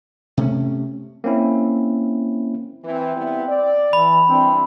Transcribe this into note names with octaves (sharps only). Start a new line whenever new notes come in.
C3 A3 C#4
A#3 C4 C#4 E4
E3 C4
G3 B3 E4
D5
E3 B5
E3 G3 C4 D4